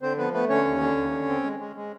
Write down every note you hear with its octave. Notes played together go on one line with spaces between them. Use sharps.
D3 C4 C5
F3 B3 B4
A3 B3 B4
D3 C#4 C#5
D#2
D3
D#2
D3
C4
G#3
G#3
G#3